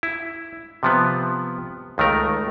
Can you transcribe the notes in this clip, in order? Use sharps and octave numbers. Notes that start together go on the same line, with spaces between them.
E4
C3 F3 B3
C#2 D#3 A3 A#4